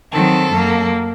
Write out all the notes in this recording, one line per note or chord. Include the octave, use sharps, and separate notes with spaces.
D#3 F#3 C4 A4
F#2 F#3 A#3